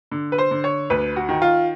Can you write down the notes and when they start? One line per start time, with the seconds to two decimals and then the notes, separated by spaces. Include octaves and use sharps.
0.11 D3
0.32 B4
0.38 C5
0.51 D3
0.64 C#5
0.90 D2 B4
1.16 F#4
1.29 D#3
1.42 F4